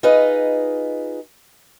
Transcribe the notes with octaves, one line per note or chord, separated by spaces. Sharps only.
D#4 F4 G#4 B4 D#5